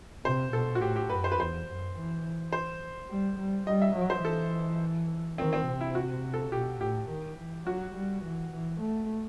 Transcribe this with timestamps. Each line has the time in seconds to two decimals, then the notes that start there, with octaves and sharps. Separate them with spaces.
0.25 C3 C5
0.53 B2 A4
0.75 F#4
0.81 A2 G4
0.96 G4
1.10 F#2 B4
1.24 C5
1.32 B4
1.38 E2 C5
1.67 F#2
1.96 E3
2.53 C5
3.10 G3
3.38 G3
3.67 G3 D#5
3.82 E5
3.96 F#3
4.10 C5
4.24 E3 A4
5.38 D#3 C4
5.53 C4
5.67 C3
5.81 E4
5.95 F#4
6.34 A4
6.52 B2 G4
6.81 A2 G4
7.09 D#3
7.38 E3
7.66 F#3 F#4
7.95 G3
8.24 E3
8.52 E3
8.81 A3